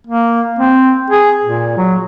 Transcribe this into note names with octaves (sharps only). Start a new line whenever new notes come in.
A#3
C4
G#4
A#2
F#3